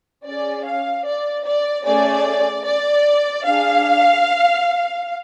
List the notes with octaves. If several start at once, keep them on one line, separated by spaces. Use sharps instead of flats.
C#4 G#4 D5
F5
D5
D5
A3 C#4 G#4 D5
D5
D4 G#4 F5